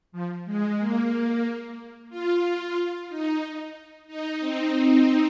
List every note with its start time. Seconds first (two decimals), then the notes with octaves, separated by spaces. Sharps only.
0.12 F3
0.45 G#3
0.79 A#3
2.09 F4
3.08 D#4
4.07 D#4
4.39 C4